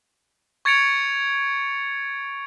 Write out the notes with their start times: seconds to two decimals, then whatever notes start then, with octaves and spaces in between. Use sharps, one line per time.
0.65 C#6 G#6 A6 C#7 D7 F7